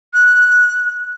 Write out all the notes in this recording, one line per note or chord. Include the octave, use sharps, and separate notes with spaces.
F#6